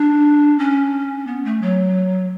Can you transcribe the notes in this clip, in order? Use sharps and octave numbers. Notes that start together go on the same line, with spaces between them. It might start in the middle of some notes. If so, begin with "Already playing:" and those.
Already playing: D4
C#4
B3
A3
F#3